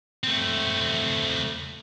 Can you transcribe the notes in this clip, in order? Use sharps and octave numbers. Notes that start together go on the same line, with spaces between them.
A3 C4